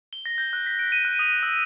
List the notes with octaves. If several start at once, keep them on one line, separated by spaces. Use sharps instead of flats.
G7
A#6
G6
F#6
B6
D7
D#7
F#6
D#6
E6